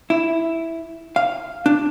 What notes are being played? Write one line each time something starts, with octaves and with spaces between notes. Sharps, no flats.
E4
F5
D4